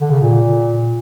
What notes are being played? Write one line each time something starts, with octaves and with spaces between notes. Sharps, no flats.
D3
C#3
A#2